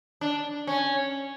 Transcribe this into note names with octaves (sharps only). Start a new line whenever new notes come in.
D4
C#4